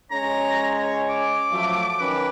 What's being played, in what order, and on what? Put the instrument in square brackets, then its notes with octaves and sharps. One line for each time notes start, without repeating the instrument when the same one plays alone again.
[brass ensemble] G#3 C#4 C#5 [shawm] A#5
[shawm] D6
[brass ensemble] F3 F#3 A3
D#3 C#4 B4